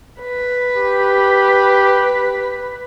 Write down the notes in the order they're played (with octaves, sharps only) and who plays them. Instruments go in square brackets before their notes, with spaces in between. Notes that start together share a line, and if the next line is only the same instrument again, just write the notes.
[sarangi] B4
[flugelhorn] G4